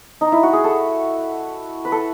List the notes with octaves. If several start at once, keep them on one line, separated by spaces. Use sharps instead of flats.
D#4
E4
F#4
G#4
A4
B4
A4